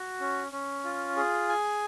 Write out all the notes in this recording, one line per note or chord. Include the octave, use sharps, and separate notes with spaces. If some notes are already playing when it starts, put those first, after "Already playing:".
Already playing: F#4
C#4
C#4
F4
G#4
G#5